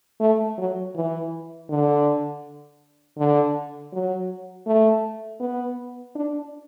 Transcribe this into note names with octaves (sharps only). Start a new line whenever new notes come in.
A3
F#3
E3
D3
D3
F#3
A3
B3
D4